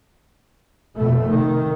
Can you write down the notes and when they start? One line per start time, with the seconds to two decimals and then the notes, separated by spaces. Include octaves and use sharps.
0.97 F1 B2 A3
1.30 D#3